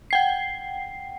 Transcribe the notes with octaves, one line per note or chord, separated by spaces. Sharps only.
F#5 G5 C7